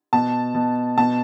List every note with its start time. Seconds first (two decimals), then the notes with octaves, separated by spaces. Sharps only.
0.13 B2 A5
0.55 B2
0.97 B2 A5